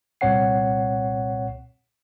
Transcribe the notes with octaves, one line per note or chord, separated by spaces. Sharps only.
C2 A#2 C4 C#5 F#5 C7